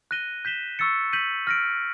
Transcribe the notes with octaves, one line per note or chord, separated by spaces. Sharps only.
F#6 A#6 D#7 G7
G6 B6 E7 G7
C#6 E6 A6 C#7
G6 B6 D#7 F#7
F6 A#6 D7